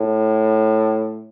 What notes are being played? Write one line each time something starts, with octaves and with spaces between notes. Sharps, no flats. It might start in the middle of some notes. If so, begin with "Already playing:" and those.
Already playing: A2